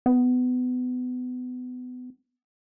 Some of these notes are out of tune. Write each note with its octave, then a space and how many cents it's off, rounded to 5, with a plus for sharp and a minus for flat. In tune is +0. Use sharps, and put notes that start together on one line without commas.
B3 +25